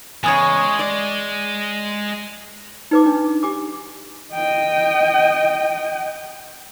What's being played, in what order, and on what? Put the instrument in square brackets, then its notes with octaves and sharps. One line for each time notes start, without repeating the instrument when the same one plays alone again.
[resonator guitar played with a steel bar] E2 C#3 C#5 [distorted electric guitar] G#3 [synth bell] G#5 D#6 G#6
[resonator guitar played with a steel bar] D5
[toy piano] D#4 B4 D6
D4
G4 G#5 D6
[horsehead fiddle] D#5 G5